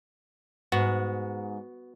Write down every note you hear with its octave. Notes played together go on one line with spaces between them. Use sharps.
G#2 B3 F#4